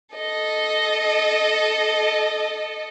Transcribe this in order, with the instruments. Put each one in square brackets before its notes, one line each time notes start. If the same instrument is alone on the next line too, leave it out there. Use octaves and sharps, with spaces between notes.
[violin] A4 D#5